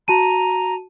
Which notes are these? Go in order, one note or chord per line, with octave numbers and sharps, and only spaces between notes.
F#4 A5 A#5 D#7